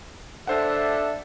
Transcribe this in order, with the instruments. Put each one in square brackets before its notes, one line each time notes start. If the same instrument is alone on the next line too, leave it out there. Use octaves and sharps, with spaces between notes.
[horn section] D4 A4 E5 [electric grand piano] C5 F#5